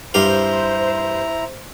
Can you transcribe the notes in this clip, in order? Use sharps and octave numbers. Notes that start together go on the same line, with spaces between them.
G2 E4 G4 C5 F5 A#5